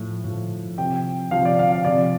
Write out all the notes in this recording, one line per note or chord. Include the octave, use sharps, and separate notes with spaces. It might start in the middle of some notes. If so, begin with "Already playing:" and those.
Already playing: A2 F3
A2 F3
C3 F3 G5
C3 F3 F5
D5
F5
F5
C3 F3 D5